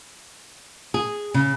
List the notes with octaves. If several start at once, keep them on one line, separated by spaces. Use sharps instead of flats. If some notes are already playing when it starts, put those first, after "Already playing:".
G#4
C#3